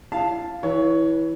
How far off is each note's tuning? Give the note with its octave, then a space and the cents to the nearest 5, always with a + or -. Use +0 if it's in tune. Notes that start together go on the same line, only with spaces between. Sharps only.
E4 +40 F5 +0 A5 +0
E3 -15 C#5 +15